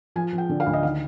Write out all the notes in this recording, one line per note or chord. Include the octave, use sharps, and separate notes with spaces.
F3 G#5
F3
G5
D3
F5
D2
D#5
D#3 F5